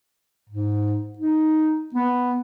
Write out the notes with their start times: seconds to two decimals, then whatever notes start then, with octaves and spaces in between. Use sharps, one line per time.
0.49 G#2
1.18 D#4
1.94 B3